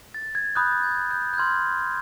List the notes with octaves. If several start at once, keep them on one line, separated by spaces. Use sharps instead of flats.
A6
G#6
B5 D#6 F#6 G6
A6
G#6
G6
G6
C6 F6 G#6